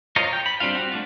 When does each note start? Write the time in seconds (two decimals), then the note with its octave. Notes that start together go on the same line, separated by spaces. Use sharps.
0.16 F4 A#4 C5 C#5 D#5
0.33 G5
0.46 B5
0.60 G3 C4 D4 F4 F5
0.75 C4 F#4
0.92 A3 D4 F4